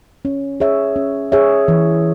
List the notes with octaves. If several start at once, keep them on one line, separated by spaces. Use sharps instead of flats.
C#4
G#4 C#5 E5
C#4
G#4 C#5 E5
E3